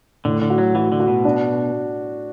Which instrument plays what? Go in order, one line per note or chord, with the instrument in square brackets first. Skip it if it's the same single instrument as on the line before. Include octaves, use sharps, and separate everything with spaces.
[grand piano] A2 [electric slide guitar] D3
[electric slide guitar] D3
[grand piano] F#4
[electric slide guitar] F#3
[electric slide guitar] E3 [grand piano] F#4
[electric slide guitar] D3
[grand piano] F#4
[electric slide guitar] B2
[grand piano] D4